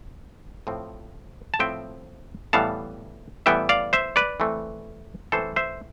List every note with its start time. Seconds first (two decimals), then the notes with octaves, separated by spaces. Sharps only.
0.67 A2 F3 C4
1.54 A5
1.59 A2 F3 C4 E5 G5
2.53 A2 E3 G3 B3 F5 A5
3.46 A2 E3 G3 B3 E5 G5
3.69 D5 F5
3.93 C5 E5
4.16 B4 D5
4.40 E3 A3 C4
5.32 E3 A3 C4 A4 C5
5.56 C5 E5